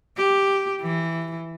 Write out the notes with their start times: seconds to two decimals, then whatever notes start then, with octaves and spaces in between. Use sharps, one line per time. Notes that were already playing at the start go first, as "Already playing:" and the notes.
0.17 G4
0.82 E3